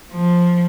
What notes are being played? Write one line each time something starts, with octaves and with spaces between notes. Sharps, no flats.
F3